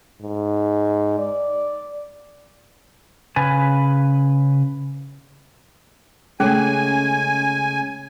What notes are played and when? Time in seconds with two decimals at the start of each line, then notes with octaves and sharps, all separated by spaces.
0.21 G#2
1.18 D5
3.36 C#3 B4 G#5
6.40 C#3 G#3 A3 C#4 G#4 G#5